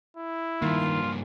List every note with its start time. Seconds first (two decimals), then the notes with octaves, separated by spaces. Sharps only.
0.17 E4
0.62 G2 D#3 A#3 F4